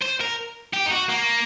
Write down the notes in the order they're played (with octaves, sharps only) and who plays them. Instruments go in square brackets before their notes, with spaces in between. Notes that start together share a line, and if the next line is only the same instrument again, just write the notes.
[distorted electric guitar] C5
A#4
G4
D#4
F#4
A#3